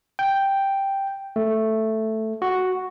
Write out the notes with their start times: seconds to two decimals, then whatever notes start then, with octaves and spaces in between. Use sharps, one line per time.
0.19 G5
1.36 A3
2.42 F#4